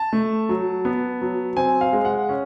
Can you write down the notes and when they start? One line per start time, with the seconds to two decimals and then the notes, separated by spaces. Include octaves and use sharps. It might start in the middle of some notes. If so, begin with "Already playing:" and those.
Already playing: A5
0.13 A3
0.49 F#3
0.85 B3
1.22 F#3
1.57 C4 G#5
1.81 F5
1.93 G#3
2.05 F#5
2.29 C#4